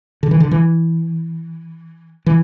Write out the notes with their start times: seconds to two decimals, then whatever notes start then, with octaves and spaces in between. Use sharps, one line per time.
0.23 D3
0.31 E3
0.40 D3
0.51 E3
2.26 E3